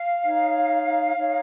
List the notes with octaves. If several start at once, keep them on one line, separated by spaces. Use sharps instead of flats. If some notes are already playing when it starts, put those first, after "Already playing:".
Already playing: F5
D#4 C#5
D#4 A#4 C#5